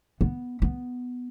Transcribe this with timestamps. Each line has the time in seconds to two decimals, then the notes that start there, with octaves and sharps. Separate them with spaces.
0.21 B3
0.62 B3